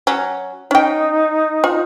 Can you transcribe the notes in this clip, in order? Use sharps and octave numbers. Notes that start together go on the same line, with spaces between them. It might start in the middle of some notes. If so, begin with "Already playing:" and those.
F#3 C#4
C#4 D#4 G5
F4